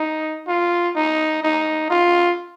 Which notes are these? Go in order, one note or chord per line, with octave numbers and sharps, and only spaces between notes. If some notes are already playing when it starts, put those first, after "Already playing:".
Already playing: D#4
F4
D#4
D#4
F4